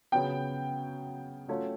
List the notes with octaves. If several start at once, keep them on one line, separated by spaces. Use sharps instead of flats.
C#3 F#3 B3 G5
F#3 A3 C#4 F4